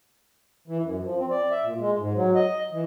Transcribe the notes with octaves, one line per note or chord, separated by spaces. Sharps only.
E3
F#2
F3
C4
D5
E5
A#2
G#3
G#2
F#3
D#5
E3